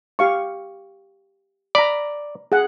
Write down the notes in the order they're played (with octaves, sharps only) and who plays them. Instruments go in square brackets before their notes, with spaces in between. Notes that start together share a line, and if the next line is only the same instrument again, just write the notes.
[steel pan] G4 F5 C#6
[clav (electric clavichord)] D5 [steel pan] A#5 B5
[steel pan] G#4 F#5